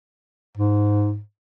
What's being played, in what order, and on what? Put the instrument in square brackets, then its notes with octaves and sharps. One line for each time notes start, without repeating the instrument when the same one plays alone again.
[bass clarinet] G#2